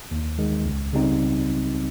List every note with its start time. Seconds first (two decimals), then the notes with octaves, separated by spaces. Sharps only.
0.11 D#2
0.38 D#3 G#3
0.65 C#2
0.93 C#3 G3 C4 D#4